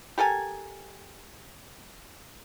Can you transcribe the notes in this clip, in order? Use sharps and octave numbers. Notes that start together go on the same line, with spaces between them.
G4 A4 A#4 G#5